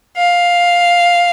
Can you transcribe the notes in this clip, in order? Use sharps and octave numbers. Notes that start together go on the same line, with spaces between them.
F5